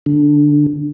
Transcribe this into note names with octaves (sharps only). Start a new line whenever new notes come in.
D3